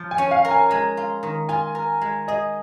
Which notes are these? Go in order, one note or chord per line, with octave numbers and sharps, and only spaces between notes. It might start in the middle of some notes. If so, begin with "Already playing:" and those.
Already playing: F3
G#5
C#4
F5
A#4
G#5
G#3 A#5
F4
D#3
F4 G#5
A#4
G#3
G#4 D#5